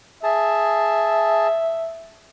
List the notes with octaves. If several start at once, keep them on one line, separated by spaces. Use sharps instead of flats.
G#4 E5 A5